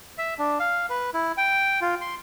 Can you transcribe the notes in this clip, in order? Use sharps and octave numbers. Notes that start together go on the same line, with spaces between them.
E5
D4
F5
B4
E4
G5
F4
C6